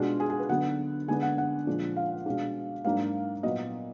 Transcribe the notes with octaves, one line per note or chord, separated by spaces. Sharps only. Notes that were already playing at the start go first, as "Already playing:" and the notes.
Already playing: B2 G#3 D4 F4
G#4
G#4
B4
D3 F#3 B3 F#5
D3 G#3 B3 D4 G#5
F#5
F#5
A#2 F3 G#3 D4
F5
B2 G#3 D4
G#2 F#3 A#3 D4 F5
A#2 F#3 B3 D#5